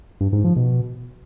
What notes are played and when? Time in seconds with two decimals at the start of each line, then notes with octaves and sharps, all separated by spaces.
0.21 G2
0.33 G#2
0.45 F3
0.56 B2